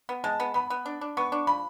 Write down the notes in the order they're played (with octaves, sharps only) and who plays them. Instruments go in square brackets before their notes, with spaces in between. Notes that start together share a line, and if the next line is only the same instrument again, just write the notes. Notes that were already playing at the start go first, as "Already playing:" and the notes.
[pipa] B3
[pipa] G#3 [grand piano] A5
[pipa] B3
[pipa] B3 [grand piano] B5
[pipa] B3
D4
D4
[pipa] B3 [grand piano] C#6
[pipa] D4
[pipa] F3 [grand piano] B5